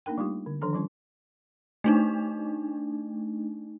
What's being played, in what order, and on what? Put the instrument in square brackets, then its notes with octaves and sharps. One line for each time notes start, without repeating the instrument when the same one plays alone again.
[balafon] A#3 D4 D#4 A#4 G5
G3 A3 D#4 F4 G4
D3
D#3 F3 D4 A4 A#5
F3 G3 C#4 F4
[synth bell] A3 D4 D#4